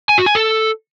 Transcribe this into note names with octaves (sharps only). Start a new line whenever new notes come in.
G#5
F#4
G#5
A4